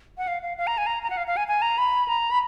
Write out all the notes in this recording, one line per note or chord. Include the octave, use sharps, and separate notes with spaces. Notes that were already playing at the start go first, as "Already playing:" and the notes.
F#5
F5
F5
F5
A#5
G#5
A#5
A#5
F#5
F5
F5
G#5
G#5
A#5
B5
A#5
B5